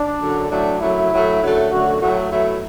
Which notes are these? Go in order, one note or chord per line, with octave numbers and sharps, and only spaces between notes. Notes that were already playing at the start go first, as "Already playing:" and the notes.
Already playing: D4
F#2 D3 F#3
A2 F#3 A3 D4
F#2 F#3 A3 E4
A2 F#3 A3
F#2 D3 F#3 A3
F#2 D3 F#3 A3 F#4
A2 F#3 A3 F#4
B2 F#3 A3 E4